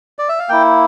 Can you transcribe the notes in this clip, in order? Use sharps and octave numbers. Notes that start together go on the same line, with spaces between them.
D5
E5
F5
A#3 E4 G5